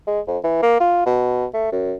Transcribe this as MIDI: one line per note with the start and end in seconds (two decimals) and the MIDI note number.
0.07 0.20 56
0.27 0.38 41
0.44 0.58 52
0.62 0.76 58
0.80 1.02 65
1.06 1.45 47
1.54 1.70 57
1.72 1.94 42